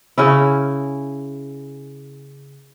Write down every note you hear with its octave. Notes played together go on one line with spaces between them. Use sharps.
C#3 C#4 E4